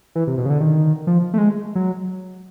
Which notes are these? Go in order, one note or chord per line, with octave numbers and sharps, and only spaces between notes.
E3
C3
B2
C#3
D3
D#3
F3
A3
G#3
F#3